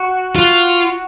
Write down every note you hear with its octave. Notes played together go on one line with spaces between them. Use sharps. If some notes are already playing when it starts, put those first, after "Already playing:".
Already playing: F#4
F4